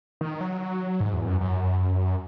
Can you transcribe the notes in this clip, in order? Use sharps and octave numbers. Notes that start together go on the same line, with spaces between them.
D#3
F#3
G#2
E2
F#2
F#2